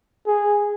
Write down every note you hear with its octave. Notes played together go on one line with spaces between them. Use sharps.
G#4